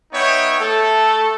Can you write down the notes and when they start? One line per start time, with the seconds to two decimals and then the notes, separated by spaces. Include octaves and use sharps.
0.12 B3 D#4 C#5 E5 G5
0.59 A3 A4